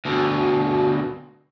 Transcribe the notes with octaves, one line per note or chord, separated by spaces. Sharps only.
D2 B2